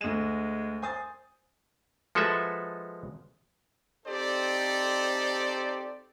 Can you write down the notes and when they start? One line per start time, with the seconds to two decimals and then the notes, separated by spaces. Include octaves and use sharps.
0.01 D2 G#3 E7
0.82 C5 G#5 D#6 A6
2.15 F3 G#3 F#4 A4 B4 E5
4.06 C4 D#4 G4 A4 C5 D5